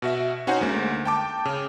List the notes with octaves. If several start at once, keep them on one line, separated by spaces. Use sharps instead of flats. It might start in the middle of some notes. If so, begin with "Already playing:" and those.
B2 F#4 E5
C#4 D#4 F#4 C5 F#5 G#5
D2 G#3 A#3
G5 A5 D6
C#3